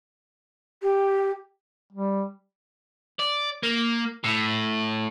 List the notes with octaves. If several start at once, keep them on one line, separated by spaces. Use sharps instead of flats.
G4
G3
D5
A#3
A2